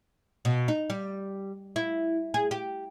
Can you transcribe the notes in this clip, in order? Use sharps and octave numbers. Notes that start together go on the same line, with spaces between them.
B2
D#4
G3
E4
G#4
G4